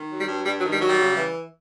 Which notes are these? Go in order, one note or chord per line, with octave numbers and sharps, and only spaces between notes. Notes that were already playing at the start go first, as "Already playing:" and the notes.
Already playing: D#3
F#3
G3
G2
G2 G3
F#3
D#3
G3
F#3
G3
C#3
E3